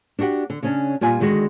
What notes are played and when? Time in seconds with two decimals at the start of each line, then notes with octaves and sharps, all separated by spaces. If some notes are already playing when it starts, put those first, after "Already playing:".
0.19 D4 E4 F#4 G4 F#5
0.50 D3
0.63 C#3 C#4 D4
1.01 A#2 G3 F4 G#5
1.20 D3 D#3 G#3 F#4